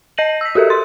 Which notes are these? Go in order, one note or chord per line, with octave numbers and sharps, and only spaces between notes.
D#5 G6 A#6 D#7 F#7
E6 B6
F#4 G4 A4 A#4 E5
C6 A6